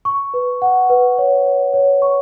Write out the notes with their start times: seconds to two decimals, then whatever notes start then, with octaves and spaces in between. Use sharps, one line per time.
0.05 C#6
0.34 B4
0.62 F#5
0.89 B4
1.18 C#5
1.46 C#5
1.74 C#5
2.02 C#6